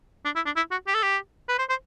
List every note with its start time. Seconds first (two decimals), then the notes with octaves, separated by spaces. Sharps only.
0.25 D4
0.36 E4
0.46 D4
0.56 E4
0.71 F#4
0.87 G4
0.94 A4
1.03 G4
1.49 B4
1.59 C5
1.70 C5